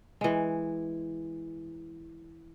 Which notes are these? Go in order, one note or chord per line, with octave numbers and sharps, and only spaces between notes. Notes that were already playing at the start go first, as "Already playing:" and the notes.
E3 G#3